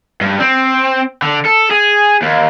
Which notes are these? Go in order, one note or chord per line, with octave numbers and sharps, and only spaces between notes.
G2
C4
D3
A4
G#4
D#2